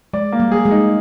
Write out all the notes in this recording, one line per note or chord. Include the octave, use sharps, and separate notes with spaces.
G#3 D5
A#3
G3
G3 G#4
G#3
D#4